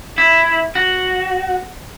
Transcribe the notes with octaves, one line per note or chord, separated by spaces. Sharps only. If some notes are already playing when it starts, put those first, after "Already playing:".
E4
F#4